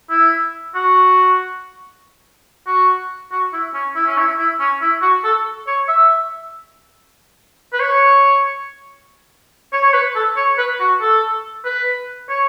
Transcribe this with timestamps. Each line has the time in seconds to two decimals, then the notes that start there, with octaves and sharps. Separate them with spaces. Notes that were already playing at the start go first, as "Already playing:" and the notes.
0.10 E4
0.75 F#4
2.67 F#4
3.32 F#4
3.53 E4
3.73 C#4
3.95 E4
4.06 C#4
4.17 E4
4.38 E4
4.59 C#4
4.82 E4
5.02 F#4
5.24 A4
5.67 C#5
5.88 E5
7.73 B4
7.80 C#5
9.73 C#5
9.84 C#5
9.94 B4
10.15 A4
10.36 C#5
10.58 B4
10.80 F#4
11.01 A4
11.65 B4
12.29 C#5